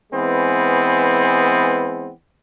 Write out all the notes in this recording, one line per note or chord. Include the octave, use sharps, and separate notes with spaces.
E3 G#3 B3 C4